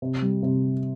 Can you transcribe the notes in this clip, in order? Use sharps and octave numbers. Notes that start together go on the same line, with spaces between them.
C3
G3
C3